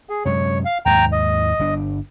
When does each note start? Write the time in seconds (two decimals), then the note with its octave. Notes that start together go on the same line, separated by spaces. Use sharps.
0.09 G#4
0.25 F#2 C3 G#3 C#5
0.65 F5
0.86 D#2 G#2 G5 A#5
1.12 D#5
1.59 G1 G3 D4